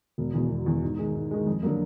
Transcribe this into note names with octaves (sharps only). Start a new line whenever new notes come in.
E1
E2 B2
E1
E2 B2
G#2
D#3 G#3
G#2
D#3 G#3
F2
D3 F#3 A#3